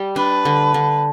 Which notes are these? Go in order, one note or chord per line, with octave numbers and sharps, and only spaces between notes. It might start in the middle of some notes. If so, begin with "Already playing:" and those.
Already playing: G3
D4 B4
D3
D3